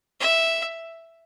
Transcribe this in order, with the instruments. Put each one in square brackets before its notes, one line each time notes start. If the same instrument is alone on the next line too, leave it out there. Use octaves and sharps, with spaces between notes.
[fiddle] E5